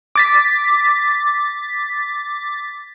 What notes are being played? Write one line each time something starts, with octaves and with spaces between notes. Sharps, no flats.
D6 A6 B6